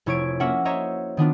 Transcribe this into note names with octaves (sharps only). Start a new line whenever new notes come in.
F1 E4 C#5 C#6 G#6 D7
A#3 C#4 F#4 A#4 E5 F#5
C5 C#5 D#5 E5 A#5
D#3 B3 D4 F4